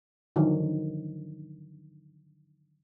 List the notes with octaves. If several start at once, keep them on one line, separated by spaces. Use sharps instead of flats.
D3 D#3 F3 F#3